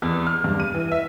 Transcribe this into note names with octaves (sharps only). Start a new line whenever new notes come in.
E2
F6
G2
D#7
E3
E5